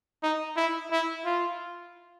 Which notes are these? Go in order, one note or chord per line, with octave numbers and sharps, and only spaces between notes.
D#4
E4
E4
F4